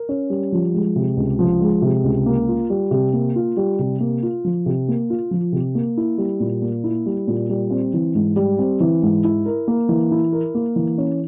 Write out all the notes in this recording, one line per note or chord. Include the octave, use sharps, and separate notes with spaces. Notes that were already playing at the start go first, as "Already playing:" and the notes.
Already playing: A#4
C#4
G3
F3
G#3
C3
C#2
F3
G#3
C3
C#2
A#3
F4
G3
C3
A#3
F4
G3
C3
A#3
F4
F3
C3
A#3
F4
F3
C3
A#3
E4
G3
A#2
A#3
E4
G3
A#2
G3
C4
E3
G#2
G3
C4
E3
G#2
E4
A#4
A#3
E3
E4
A#4
A#3
E3
C#4